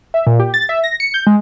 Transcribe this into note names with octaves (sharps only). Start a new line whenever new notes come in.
E5
A#2
G4
A6
E5
A#6
C#7
G6
G#3